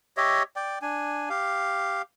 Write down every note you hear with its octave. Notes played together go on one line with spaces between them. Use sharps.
G4 C#5 D#5 E5
D5 G5
D4 G#5
G4 F5